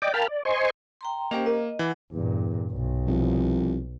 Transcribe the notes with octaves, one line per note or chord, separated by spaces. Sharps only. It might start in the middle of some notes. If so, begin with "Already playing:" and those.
D5 D#5 G5 D6
A#4 F5 G5 A5 B5 F6
D5
C5 D#5 G#5 C6 C#6
G5 A#5 C6
A#3 C#4 G4 C5 D#5 G5
A#4 D#5
E3 F#5
E2 G2 A#2
B1
C2 F3